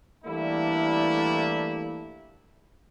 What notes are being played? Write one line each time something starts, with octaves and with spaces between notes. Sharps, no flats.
E3 G3 A3 A#3 D4 E4